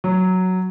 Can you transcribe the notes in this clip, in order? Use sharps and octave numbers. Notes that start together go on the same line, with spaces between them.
F#3